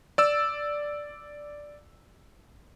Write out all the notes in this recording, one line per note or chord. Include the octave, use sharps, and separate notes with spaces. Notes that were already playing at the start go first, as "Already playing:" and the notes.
D5 E6